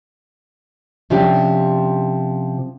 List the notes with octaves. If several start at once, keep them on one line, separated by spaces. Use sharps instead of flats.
C3 F3 C#4 D4 G4